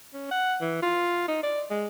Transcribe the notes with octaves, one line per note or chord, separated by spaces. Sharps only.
C#4
F#5
E3
F4
D#4
D5
G#3